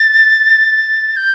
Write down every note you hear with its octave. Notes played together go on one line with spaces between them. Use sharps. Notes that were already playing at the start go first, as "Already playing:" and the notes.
Already playing: A6
G6